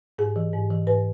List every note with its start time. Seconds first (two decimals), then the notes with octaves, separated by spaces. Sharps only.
0.18 G#2 G#4
0.36 E3
0.53 G#2
0.70 E3
0.87 G#2 B4